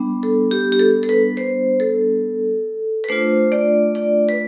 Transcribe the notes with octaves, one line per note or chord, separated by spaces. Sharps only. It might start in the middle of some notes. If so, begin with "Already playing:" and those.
Already playing: G3 B3 D4
A4
G4
G4
A4
A4
B4
C5
A4
B4
A3 D4 F4 C5
D5
D5
B4